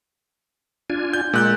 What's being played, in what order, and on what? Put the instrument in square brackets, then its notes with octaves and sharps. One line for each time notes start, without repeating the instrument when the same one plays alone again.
[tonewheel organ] D4 F4 G#5
[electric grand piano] G6
[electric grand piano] A#2 F#6 G6 [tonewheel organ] G#3